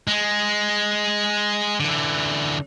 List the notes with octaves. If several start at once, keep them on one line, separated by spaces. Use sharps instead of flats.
G#3
D3 E3